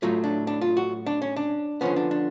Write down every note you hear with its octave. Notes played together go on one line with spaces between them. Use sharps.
A2 F#3 A3 F4
D4
D4
F4
F#4
D4
C#4
D4
D3 F3 B3 C#4
D4
D4